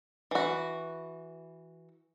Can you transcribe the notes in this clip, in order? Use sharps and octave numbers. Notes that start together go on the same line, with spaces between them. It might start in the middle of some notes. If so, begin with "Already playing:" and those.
E3 F#4